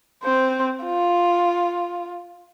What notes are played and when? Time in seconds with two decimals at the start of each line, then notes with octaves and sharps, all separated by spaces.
0.24 C4 C5
0.84 F4